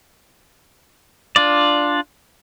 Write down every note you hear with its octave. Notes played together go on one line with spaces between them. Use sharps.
D4 F4 D5